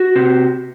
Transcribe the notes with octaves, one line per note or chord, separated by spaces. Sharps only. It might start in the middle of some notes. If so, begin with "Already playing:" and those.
Already playing: F#4
C3